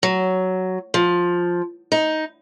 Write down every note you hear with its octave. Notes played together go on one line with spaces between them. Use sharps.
F#3
F3
D#4